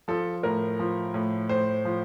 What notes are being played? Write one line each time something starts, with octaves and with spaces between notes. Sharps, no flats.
F3 A4
A2 A#4
F3
A2
A2 C5
F3